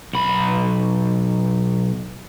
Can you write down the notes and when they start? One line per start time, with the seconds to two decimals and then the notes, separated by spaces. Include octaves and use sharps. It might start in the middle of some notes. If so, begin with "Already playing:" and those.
0.13 B1 B5